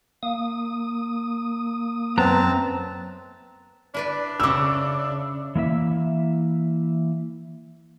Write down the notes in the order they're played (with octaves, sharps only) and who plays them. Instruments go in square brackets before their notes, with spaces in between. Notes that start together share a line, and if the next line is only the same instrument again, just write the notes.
[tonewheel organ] A#3 D#6
[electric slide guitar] F#2 A#5 [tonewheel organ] B3 B4 [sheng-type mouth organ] C4 A5
[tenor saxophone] D4 [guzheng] E4 B4 D5
[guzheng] C#3 E4 [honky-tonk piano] D6 E6
[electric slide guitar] E3 A#3 E4 E5